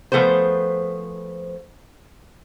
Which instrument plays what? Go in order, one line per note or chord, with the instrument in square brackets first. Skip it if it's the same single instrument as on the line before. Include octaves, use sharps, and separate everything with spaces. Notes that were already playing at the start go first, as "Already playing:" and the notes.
[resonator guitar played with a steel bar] F3 A3 B3 G#4 C5